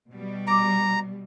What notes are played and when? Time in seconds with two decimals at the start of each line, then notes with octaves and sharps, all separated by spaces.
0.11 B2 G3
0.47 A#5 D6